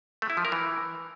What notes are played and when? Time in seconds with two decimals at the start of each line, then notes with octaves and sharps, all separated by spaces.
0.22 A3
0.30 E4
0.37 F3
0.45 A#4
0.52 E3